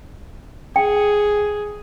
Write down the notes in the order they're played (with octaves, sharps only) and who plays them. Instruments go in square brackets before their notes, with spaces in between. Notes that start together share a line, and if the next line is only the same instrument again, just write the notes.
[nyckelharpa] G#4 [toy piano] G5